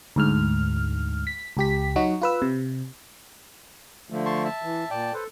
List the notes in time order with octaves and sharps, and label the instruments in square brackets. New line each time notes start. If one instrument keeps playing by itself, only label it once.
[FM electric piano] D2 G#2 F6
B6
C#2 G4 B6
F#3 D#4 F#4
F4 B4 E6
C3
[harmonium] D3 F3 A3
[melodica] A5 C6 C#6
E5 A5
[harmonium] E3
[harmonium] A#2 [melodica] D5 G5 A5
[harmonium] A4 [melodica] B4 C5